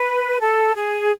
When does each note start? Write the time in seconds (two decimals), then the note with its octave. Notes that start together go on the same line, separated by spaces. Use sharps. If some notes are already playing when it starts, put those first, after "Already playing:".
Already playing: B4
0.40 A4
0.74 G#4